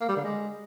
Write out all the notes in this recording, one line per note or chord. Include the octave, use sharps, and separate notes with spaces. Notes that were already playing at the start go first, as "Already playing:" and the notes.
A#3
G3
D3
G#3